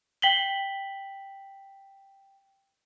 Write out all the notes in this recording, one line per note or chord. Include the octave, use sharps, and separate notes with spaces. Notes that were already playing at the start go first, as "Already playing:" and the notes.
G5 B6 F#7 G7